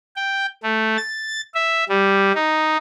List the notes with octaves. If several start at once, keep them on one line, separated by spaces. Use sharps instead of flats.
G5
A3
A6
E5
G3
D#4